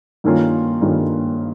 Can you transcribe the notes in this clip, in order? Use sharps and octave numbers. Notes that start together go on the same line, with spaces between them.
G2 D#3 A#3 C#4 F4
G2 D#3 A#3 C#4 F4